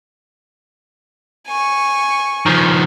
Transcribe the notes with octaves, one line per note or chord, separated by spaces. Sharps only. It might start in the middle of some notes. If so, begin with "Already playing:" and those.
G#5 C#6
D#3 F3